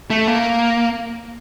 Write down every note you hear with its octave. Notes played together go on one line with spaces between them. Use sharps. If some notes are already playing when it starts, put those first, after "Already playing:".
A3
A#3